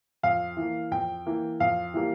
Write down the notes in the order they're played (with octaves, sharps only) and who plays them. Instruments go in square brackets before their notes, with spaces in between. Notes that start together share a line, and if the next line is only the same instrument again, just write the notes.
[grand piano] F2 F5
E3 A#3
F2 G5
E3 A#3
F2 F5
E3 G3 A#3